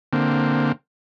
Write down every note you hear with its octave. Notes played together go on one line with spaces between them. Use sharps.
D3 A#3 C4